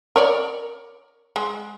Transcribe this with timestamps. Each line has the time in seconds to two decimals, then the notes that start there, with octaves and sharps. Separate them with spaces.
0.16 A#4 C#5 D5
1.36 G#3